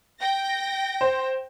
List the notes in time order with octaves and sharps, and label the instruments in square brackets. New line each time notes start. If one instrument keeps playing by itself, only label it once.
[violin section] G5 A#6
[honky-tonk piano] C5